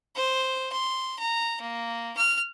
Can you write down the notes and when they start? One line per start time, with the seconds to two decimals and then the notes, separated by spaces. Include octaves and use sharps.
0.16 C5
0.73 C6
1.19 A#5
1.61 A#3
2.17 F6